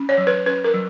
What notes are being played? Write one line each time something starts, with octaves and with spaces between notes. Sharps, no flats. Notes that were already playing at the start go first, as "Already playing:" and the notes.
Already playing: C#4
C#5
F#3
B4
C#4 B4
A#4
F#3